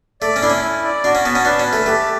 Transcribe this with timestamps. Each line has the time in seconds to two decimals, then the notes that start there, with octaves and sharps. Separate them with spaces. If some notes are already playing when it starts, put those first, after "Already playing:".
0.21 A3 D5
0.36 C#4
0.43 D4 E4
0.50 C#4
0.63 E4
0.84 D5
1.04 D4 F#4
1.15 C#4
1.25 B3 A5
1.35 C#4
1.45 D4 B4
1.60 C#4
1.66 A5
1.73 A3
1.86 A3 G4